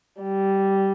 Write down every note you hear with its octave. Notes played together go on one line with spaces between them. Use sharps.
G3